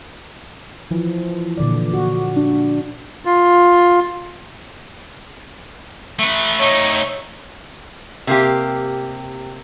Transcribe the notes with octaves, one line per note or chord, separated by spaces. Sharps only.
E3 F3
A#2 D3 D5
F#4
D4
F4
A3 B4
A3 D#4 C#5
C3 A#3 G4